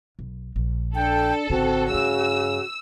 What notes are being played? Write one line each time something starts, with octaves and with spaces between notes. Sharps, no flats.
B1
A#1
D4 A4 G5
G#1 C#3 C4 F#4
G2 C#3 A3 E6